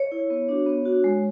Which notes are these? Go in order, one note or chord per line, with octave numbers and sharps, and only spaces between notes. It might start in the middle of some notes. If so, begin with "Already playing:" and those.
Already playing: C#5
E4
B3
D4 F#4
B3
D4 F#4
G#3